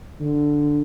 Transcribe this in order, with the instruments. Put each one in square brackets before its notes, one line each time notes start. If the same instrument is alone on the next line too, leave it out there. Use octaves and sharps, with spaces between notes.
[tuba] D3